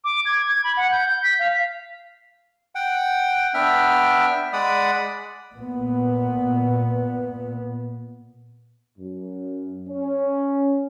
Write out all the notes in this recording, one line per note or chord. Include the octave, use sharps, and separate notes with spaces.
D6
G#6
G#6
B5
F#5
G6
G6
B6
F5
F#5 G5
B3 D4 E5 G5 F6
G#3 D5 F#5 B5 D#6
A#2 B3
F#2
C#4